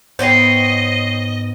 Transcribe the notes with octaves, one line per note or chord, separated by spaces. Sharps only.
G#2 B3 C5 C#5 D#5 G5 C7